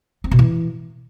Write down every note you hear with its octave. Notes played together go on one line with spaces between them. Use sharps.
C4
B2
E3